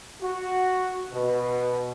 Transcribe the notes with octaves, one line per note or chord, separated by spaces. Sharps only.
F#4
B2